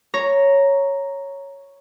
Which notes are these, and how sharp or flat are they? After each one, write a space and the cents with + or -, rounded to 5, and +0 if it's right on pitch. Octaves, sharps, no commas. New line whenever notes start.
C#5 +0 A#5 +0